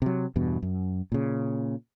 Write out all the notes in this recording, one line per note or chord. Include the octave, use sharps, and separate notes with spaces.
C3 F#3
E2 G2 B2
F#2
A#2 C#3